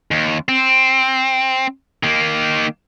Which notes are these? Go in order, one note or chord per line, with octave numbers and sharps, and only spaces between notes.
D#2
C4
D#3 A#3